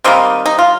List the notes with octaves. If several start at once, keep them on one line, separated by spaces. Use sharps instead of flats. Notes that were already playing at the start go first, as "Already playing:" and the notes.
D#3 G3 A#3 C4 D#4
D#4
F4